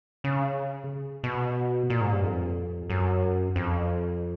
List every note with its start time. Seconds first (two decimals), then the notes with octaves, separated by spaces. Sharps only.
0.24 C#3
1.24 B2
1.90 A#2
2.01 G#2
2.12 G2
2.23 F2
2.90 F#2
3.56 F2